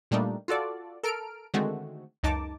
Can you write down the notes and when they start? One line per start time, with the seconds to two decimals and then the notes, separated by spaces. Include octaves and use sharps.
0.11 A#2 G3 A3 A#3 D4 D#4
0.48 F4 F#4 A4 D5
1.03 A4 A#4 F6 D7
1.54 D3 D#3 G#3 A3 C4 F#4
2.23 C#2 F#2 D#4 A5 D6